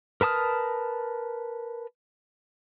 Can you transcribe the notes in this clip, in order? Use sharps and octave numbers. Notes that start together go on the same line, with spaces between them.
A#4 B4 A5 D#6 F6